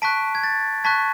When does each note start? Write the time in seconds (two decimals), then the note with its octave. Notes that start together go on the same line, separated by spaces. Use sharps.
0.02 A5 C#6 F#6 B6 D7
0.35 G#6
0.44 A6
0.84 A5 C#6 F#6 G#6 B6